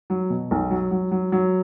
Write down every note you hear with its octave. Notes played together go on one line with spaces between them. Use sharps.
F#3
B2
B1
F#3
F#3
F#3
F#3